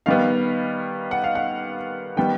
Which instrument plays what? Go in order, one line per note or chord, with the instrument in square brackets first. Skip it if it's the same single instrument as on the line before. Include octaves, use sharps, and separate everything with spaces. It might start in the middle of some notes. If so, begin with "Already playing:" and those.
[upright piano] D#3 G3 B3 F5
F#5
F5
F#5
D#3 G3 B3 G5